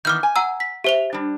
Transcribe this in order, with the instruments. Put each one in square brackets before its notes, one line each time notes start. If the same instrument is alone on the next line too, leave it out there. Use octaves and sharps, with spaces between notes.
[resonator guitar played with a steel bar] D#3 E3 B3 [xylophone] D6 F6 G6
[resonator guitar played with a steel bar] G#5
[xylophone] F#5 A#5 E6
B6
[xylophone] G4 C5 F7 [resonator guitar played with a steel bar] E5
[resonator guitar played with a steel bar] G3 D4